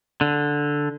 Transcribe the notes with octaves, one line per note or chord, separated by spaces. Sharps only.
D3